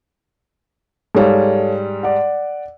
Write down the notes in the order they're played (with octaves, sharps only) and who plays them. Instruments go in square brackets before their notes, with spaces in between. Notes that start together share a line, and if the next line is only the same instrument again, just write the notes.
[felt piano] G#2 G3 [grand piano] A4 C#5 F5
[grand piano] D5 F#5